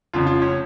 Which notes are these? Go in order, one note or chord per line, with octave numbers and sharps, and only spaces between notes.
F1 F2 C#3 F4
F4
C#4